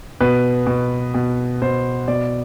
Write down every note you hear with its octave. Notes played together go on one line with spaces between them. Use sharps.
B2 B4
B2
B2
B2 C5
B2 D5